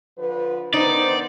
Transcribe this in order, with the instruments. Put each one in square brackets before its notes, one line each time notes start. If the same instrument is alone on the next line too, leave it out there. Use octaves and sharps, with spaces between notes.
[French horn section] D3 F3 B4
[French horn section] D#3 B3 C5 [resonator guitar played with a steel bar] D#4 [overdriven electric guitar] D5